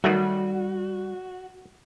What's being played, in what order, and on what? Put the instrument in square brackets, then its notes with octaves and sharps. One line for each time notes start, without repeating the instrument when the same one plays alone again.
[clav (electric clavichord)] D#3 F#3 A3 [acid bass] G3 [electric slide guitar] F#4